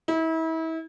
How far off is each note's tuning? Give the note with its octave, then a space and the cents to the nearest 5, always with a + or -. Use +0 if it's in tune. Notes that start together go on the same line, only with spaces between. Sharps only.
E4 -35